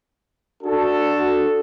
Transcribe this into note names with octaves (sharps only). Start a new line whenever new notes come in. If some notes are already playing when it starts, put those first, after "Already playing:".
D4 F#4 A4